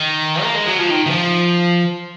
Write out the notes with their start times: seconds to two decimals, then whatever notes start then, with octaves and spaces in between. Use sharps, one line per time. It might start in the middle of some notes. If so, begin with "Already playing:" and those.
Already playing: D#3
0.43 A#3
0.55 G#3
0.67 F#3
0.79 F3
0.90 D#3
1.07 D#3
1.10 F3